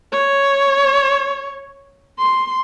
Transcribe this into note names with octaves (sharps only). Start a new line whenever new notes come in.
C#5
C6